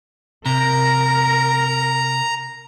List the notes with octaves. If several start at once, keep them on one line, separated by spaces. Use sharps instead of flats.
C3 A#4 A#5